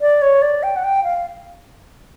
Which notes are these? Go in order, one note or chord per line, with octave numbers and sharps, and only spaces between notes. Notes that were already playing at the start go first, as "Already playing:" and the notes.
D5
C#5
D5
G5
F#5
G5
F5